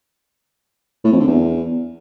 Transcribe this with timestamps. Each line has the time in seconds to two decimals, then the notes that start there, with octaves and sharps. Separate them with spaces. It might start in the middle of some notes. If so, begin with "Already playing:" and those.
1.04 A2
1.12 F2
1.20 D3
1.27 E2